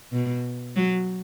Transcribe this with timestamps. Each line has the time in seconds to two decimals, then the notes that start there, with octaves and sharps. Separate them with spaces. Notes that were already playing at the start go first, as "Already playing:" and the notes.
0.12 B2
0.76 F#3